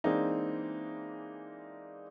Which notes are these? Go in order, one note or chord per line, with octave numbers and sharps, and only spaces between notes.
E3 G#3 A#3 C4 D4 D#4